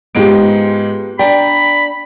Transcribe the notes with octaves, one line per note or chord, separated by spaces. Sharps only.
G#2 G#3 B3 F4 G4 D7
D4 D5 G5 A#5 B5